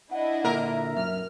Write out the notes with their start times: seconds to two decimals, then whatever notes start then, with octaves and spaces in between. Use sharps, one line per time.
0.11 D4 E4 D#5 F#5
0.45 A#2 D3 A#4 E5
0.97 B1 F#2 F6